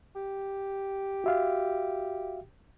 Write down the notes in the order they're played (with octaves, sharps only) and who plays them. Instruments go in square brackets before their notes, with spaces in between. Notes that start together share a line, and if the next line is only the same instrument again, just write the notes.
[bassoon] G4
[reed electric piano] F#4 E5 F5